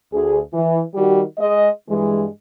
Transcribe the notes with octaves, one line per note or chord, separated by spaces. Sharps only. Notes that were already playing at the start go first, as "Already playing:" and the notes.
D2 G#4
E3
D#3 G3 F#4 G4
G#3 D#5
G2 E3 G#3